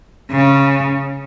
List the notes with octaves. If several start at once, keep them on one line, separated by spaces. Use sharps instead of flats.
C#3